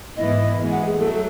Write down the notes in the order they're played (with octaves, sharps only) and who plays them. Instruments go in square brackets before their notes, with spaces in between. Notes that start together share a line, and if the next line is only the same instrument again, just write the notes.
[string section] G#2 E3 B3 E4 [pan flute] D#5
[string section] F#2 E3 G#3 B3
[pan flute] F#5
G#4
[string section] F#3 A3 [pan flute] A4
[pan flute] A4